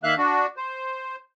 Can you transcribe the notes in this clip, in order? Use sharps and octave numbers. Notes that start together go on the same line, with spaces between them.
D#3 A#3 E5 F5 F#6
D4 F#4
C5